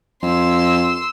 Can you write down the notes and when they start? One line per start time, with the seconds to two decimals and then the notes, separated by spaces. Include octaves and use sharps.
0.23 F2 C6 E6